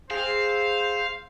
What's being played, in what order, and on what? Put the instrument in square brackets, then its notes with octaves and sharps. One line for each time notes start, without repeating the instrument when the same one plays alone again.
[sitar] C4 G#4 [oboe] C5 [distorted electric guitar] F5